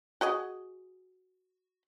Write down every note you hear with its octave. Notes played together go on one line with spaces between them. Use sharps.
F#4 G#4 D#5